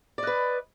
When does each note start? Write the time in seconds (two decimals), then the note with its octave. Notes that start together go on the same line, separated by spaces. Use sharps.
0.18 D5
0.23 D#5
0.27 B4